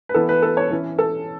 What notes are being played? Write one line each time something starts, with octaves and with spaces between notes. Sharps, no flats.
B4
E3 B3 E4 A4
B4
A4
C#5
E3 C#4 E4
A4